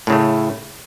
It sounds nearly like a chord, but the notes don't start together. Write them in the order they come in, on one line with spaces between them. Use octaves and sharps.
A2 C#3 A3